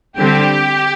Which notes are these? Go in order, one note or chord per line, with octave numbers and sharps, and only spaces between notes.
D3 G3 C4 G4